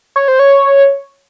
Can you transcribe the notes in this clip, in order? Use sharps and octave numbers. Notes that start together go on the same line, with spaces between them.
C#5
C5
C#5